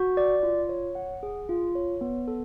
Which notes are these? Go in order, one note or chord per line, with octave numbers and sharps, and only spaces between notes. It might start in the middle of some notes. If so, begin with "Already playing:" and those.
Already playing: F#4
D5
F4
C#5
F#5
G#4
F4
C#5
B3
A4